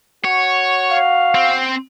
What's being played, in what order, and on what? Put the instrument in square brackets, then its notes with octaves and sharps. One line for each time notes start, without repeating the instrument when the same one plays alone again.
[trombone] F#4 [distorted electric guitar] C#5
[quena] F5
[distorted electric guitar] C4